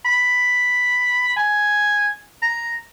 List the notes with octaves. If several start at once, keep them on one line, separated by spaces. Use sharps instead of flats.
B5
G#5
A#5